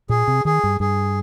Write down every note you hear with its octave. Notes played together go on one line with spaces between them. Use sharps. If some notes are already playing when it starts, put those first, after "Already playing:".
A#2 G#4
C3
D#3 G#4
G2
G2 G#4